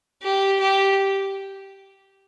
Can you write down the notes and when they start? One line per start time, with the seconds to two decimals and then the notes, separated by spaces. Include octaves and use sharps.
0.22 G4
0.60 G4